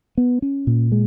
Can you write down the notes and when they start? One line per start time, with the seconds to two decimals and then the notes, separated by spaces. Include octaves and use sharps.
0.18 B3
0.42 C#4
0.67 A#2
0.92 G#3